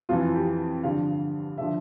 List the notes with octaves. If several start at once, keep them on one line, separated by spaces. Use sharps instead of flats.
F2 E3 F4
G4
G2 D3 F3 F5
D3 F3 E5